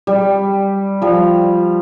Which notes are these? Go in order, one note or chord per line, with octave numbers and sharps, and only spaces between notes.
G3
F3 G3